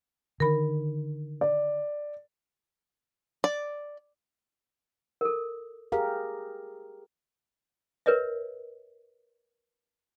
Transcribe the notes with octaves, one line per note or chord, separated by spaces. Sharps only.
D3 D#3 A#4 B5
D5
D5
A4 A#4
G4 G#4 A#4 F5
A#4 B4 C#5 D#5 E5